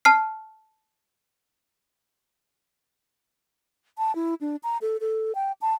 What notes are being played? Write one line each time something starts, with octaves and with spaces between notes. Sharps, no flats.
A5 F6 C7
A5
E4
D4
A#5
A4
A4
G5
A5